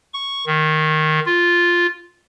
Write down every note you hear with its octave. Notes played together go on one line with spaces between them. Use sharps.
C#6
D#3
F4